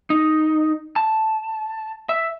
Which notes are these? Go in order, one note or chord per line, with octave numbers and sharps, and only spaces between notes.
D#4
A5
E5